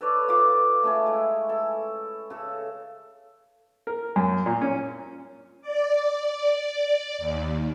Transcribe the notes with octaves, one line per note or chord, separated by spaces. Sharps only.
A4 B4 C#5 D5
F4 D6
A3 C#4 G#4
G#3 E4
A4
C#3 A4
A#4
F#2
A#2
C#4
D5
D#2